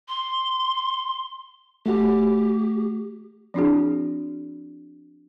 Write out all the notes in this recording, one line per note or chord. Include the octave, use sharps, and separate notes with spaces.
C6
A3 F#4 G4
F3 C4 D4 E4 F#4 G#4